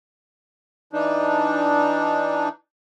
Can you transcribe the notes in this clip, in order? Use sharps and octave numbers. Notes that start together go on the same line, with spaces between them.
E3 D4 D#4